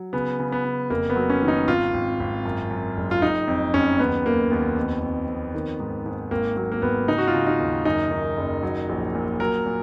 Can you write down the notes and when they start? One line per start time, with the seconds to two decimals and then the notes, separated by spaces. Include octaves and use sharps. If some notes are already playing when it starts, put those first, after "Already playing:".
Already playing: F#3
0.13 C#3 B3
0.39 C#3
0.52 B3
0.65 C#3
0.90 F1 A#3
1.10 B3
1.16 F#3
1.29 C#4
1.43 D#3
1.48 D#4
1.68 G#1 F4
1.94 G#1
2.20 G#1
2.45 F#2
2.71 F#2
2.97 F#1
3.11 F4
3.22 F#1 D#4
3.48 F2
3.73 F#1 C#4
3.99 D#2 B3
4.26 D#2 A#3
4.51 D#2 B3
4.77 F2
5.03 F2
5.28 F2
5.55 D#3
5.80 G#2
6.06 G#2
6.31 G#1 A#3
6.57 F#3 A#3
6.72 A#3
6.82 G#1 B3
7.08 C#3 D#4
7.18 F#4
7.28 F4
7.34 C#3
7.47 D#4
7.60 D#2
7.85 F#2 D#4
8.11 D#3
8.38 F#1
8.63 F#3
8.89 A#1
9.15 A#2
9.40 F#3 A#4
9.66 A#2